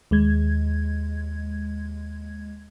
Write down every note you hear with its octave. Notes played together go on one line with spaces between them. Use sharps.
D#2 G#3 G#6